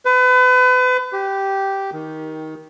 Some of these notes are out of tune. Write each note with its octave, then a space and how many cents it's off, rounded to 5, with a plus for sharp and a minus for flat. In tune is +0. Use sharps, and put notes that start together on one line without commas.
B4 +35
G4 -10
D#3 +15